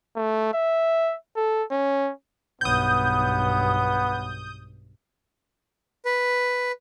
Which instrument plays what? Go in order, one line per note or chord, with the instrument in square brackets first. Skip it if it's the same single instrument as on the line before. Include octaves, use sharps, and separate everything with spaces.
[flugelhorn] A3
E5
A4
C#4
[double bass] B1 G2 [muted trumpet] B3 [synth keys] D#6 G6
[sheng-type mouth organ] B4